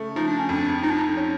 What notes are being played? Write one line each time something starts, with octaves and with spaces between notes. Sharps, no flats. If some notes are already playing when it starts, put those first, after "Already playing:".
Already playing: C#3 A3
F3 D#4
D4
C#4
F2 D4
F3 D#4
D4
D#4
C#4